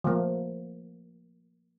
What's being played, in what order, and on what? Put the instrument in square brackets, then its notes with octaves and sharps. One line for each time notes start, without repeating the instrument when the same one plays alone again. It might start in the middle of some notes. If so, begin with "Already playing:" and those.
[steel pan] F3 A3 A#3